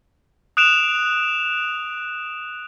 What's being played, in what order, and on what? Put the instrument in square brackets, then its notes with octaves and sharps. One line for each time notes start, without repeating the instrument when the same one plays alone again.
[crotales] D#6 F#6 D7 E7 F7